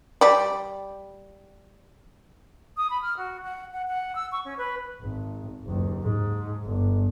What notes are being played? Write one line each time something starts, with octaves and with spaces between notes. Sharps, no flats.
G3 D5
D#6
B5
F6
F#4
F#5
F#5
F#5
E6
C#6
C#4
B4
G#1
F#1 D#2
G#2
G1